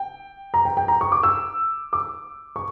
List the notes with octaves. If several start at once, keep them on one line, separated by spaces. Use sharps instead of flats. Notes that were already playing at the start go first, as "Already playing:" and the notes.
Already playing: G5
A#5
G5
G5
A#5
C#6
D6
E6
D6
C#6